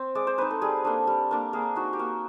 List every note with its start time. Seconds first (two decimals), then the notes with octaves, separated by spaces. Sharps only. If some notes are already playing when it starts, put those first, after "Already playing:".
Already playing: C4
0.15 G#3 D5
0.27 C5
0.38 C4 D#4 B4
0.51 A4
0.61 G3 G#4
0.85 A#3 D4 A4
1.07 G3
1.31 A#3 D4
1.53 A#3 G#4
1.76 D#4 F#4
1.93 G4
1.99 A#3 F#4